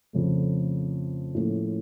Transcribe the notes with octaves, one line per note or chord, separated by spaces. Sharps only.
F2 C#3 F3 A3
A2 F3 A#3 C#4